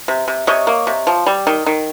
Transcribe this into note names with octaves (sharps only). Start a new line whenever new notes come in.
C3
C3
C3 C#5 D#5
A#3
C3
F3
G3
D#3
D#3